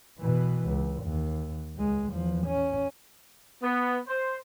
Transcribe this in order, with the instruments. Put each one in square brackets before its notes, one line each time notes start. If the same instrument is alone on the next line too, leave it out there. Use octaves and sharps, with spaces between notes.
[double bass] B2 E3
C#2
D#2
C#2 G#3
E2 F3
C#4
[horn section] B3
C5